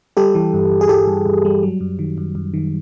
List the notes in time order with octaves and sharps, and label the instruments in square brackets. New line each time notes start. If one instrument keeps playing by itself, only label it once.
[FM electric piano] G3 G4 A4
E3
G2
G2
G#4
G2 G4 A4
G2
G2
G3
F#3
F#2
D#3
F#2
F#2
D#3